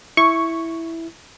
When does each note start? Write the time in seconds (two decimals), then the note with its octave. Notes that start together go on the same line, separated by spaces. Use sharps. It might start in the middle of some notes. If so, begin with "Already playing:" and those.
0.17 E4 C#6